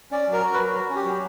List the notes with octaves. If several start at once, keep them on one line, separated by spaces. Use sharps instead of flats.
C#4 D5
F#3 A#4
F#4
B4
F#3
F#4
C#4
G4
F#3